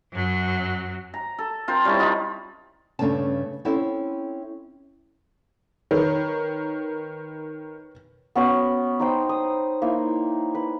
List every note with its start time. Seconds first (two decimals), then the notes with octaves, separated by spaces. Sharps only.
0.14 F#2 F#3
1.14 A#5
1.39 A4
1.68 C4 F4 A#4 C5
1.85 G3 C#4 E4 A5
1.99 D#4 F4 B5
2.99 G2 C#3 A3 C#4 D4 A5
3.65 C4 C#4 E4 A4 E5
5.91 D#3 B4 C#5
8.35 B3 C#4 F#4 B4
8.99 D#4 C5 G5
9.29 D#6
9.82 A#3 D#4 E4
10.55 B4